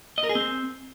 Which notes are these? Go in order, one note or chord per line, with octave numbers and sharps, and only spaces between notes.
D#5
A#4
G#4
C4